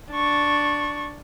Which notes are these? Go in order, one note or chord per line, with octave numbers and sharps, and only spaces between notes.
D4 C#6